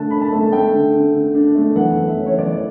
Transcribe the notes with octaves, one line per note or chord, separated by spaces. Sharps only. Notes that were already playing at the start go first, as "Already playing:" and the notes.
Already playing: D3 A3 A5 F#6
D4 B5
A5
A3
A5
A3 G5
D3
D3
D3
D4
A3
E3 F#5
E3
E5
C#4
C#5
E3 D5